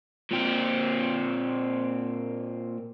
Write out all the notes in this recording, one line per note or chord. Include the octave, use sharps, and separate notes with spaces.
A#2 C4